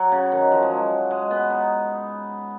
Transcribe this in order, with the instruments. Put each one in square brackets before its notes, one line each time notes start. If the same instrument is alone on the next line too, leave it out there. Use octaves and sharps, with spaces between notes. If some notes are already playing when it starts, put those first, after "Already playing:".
Already playing: [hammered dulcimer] F#3
C#3
D#3
F3
G#3
F#3
G#3
B3
D#4